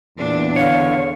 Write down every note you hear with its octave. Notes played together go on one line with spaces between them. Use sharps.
E2 A#2 D4
D3 C#5 F5